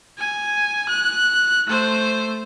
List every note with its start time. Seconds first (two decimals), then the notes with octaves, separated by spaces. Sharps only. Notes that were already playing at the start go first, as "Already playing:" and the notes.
0.18 G#5
0.89 F#6
1.67 A3 C5